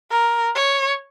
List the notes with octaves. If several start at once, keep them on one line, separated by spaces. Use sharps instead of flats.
A#4
C#5